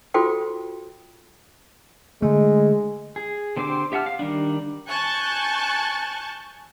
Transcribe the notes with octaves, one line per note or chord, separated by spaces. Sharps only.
F4 F#4 A4 C5 G5 D6
D3 G#3 A3
G#4
D3 C4 G4 C5 D6
G4 E5 F#5 A5 F6
F5
D#3 G3 D4
G#5 A5 C#6 F#6 G6 A6